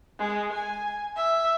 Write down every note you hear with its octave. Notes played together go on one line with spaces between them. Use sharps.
G#3
G#5
E5